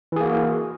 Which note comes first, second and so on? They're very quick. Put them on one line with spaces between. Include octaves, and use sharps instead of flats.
E3 G#4 A#3 F#4